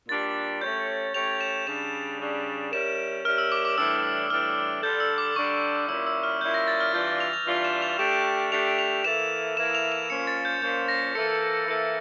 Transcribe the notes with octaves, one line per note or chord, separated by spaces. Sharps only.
A#2 G3 D4 G4 A6
A3 C#4 G4 C#5 G6
A3 C#4 G4 C#5 F7
E7
C#3 G3 D4 E7
C#3 G3 D4
G3 C#4 E4 A#4 E7
G3 C#4 E4 A#4 F6
E6
D6
D6
A2 E3 G3 D4 E6
A2 E3 G3 D4 F6
D3 G3 D4 A4 G6
E6
D6
D3 G3 D4 A4 C#6
A#2 G3 C#4 E4 E6
E6
F6
A#2 G3 C#4 E4 G6
A#6
A6
F6
E3 G3 D4 F4 G6
A6
F7
F7
E3 G3 D4 F4
E7
F7
A3 D4 G4 E7
A3 D4 G4 F7
F7
E3 A#3 E4 A4 E7
E3 A#3 E4 A4 E7
F7
E7
A#2 F3 A#3 C#4 C#7
A6
G6
A#2 F3 A#3 C#4 G6
A#6
E3 A#3 E4 A4 C#7
E3 A#3 E4 A4 C#7